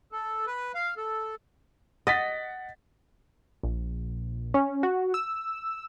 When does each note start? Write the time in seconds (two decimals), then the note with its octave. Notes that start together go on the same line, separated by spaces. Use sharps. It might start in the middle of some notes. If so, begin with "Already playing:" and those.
0.12 A4
0.47 B4
0.75 F5
0.97 A4
2.07 D#5 F#5 A6 B6
3.63 A#1
4.54 C#4
4.83 F#4
5.14 E6